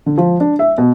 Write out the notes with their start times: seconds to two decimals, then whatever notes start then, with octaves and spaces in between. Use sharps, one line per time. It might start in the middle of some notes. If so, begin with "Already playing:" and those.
0.06 D3
0.18 F3
0.40 D4
0.59 E5
0.78 B2